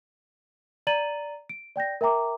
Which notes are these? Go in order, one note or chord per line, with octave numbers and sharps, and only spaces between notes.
D5 A#5 A6 D#7 F#7
D7
D5 G5 G6 A#6
A#4 E5 G5 A#5 D6